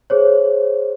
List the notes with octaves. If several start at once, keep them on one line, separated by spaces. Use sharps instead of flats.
G#4 C5 C#5